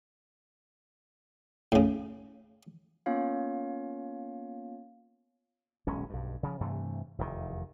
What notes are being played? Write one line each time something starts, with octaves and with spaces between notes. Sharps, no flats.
A2 C#3
A#3 B3 C#4 F4 C#5 F5
D#1 B1 G#3 C#4
B1 G2
C#3 F3
G2 C3 E3 A3
F1 E2 A2 D#3